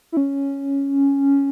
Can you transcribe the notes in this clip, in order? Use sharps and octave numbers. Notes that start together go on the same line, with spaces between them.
E4
C#4